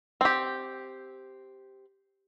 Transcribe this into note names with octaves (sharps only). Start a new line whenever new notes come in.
C4 G4